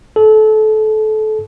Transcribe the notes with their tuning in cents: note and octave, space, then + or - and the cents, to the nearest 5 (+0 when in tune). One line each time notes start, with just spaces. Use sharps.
A4 -25